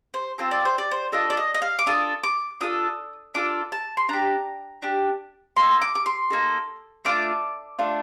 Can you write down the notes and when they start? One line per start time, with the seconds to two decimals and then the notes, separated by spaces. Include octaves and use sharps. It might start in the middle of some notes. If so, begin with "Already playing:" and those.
0.14 C5
0.38 C4 F4 A4 C5
0.51 D5
0.65 C5
0.78 D5
0.91 C5
1.12 D4 F4 A4 D#5
1.30 D5
1.37 D#5
1.54 D#5
1.62 F5
1.79 D6
1.86 D4 F4 A4 D#6
2.24 D6
2.61 D4 F4 A4 D#6
3.34 D4 F4 A4 D6
3.72 A5
3.97 C6
4.09 D4 G4 A#5
4.82 D4 G4
5.57 A#3 D#4 A4 C6
5.82 D6
5.95 D6
6.06 C6
6.30 A#3 D#4 A4
7.05 A3 D4 F4 D6
7.79 A3 D4 F4